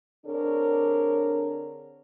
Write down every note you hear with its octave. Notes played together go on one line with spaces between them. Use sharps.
D3 C4 D4 G#4 A#4 C#5